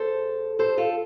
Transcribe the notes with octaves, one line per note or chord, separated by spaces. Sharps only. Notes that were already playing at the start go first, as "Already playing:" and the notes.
Already playing: E2 A4 C5
A4 C5
F4 A4